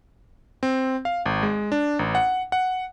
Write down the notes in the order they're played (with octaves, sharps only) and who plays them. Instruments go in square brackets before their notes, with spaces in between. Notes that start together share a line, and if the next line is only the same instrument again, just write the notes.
[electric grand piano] C4
F5
G#1
G#3
D4
A1
F#5
F#5